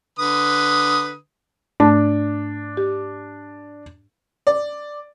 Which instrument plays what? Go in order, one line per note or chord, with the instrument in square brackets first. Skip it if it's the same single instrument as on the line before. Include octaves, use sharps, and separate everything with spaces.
[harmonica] D3 B4 D#6
[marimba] G#2 A3 A5 [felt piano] D4
[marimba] G4
[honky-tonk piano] D5